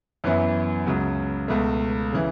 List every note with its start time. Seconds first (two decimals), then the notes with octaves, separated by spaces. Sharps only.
0.24 F#2 E3 B3 E4
0.87 C#2 C#3 F#3
1.48 C#2 B2 A3
2.12 C#3 E3